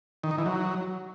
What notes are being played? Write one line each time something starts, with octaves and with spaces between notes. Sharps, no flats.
D#3
D#4
E3
F#3